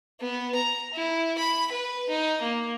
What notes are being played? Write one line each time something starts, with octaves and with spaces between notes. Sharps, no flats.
B3
A#5
E4
B5
B4
D#4
A#3